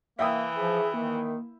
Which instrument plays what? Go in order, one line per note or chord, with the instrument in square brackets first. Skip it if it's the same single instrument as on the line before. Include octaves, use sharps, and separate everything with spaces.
[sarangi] E3 [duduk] A#3 [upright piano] E5 G5 D#6
[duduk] F3 [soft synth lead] G#4
[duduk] D#3 [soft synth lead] A#3